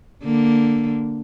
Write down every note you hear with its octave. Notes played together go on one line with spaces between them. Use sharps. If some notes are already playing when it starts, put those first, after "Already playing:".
D3 A#3